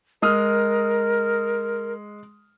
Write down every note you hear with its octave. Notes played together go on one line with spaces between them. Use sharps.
G#3 A#4 D#6 F6